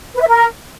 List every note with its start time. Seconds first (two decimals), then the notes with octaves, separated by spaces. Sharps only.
0.16 B4
0.22 E5
0.27 A#4